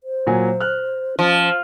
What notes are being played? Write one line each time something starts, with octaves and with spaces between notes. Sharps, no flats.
C5
A#2 F#3 G#5
F6 F#6
F3 C#4